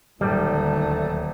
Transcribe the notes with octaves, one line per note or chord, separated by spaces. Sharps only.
D#1 D2 D#3 F#3 G3 A3